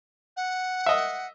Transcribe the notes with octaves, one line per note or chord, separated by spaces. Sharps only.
F#5
D#5 E5